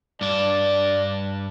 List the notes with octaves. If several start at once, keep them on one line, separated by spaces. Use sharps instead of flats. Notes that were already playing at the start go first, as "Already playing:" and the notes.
G2 D4 D5